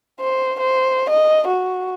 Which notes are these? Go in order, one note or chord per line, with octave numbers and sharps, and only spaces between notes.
C5
C5
D#5
F#4